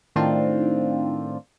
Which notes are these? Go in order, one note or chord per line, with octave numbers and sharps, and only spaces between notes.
A2 D#3 C4 D4 F4